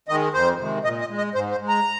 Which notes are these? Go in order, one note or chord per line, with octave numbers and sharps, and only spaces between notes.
D#3 G#3 D#5
F2 C5
C3 D#3 G#3
A#2 D#5
D#5
G#3
D#5
G#2 C5
C5
G#3
A#5